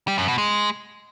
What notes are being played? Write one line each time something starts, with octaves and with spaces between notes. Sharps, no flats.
G3
F#2
B2
G#3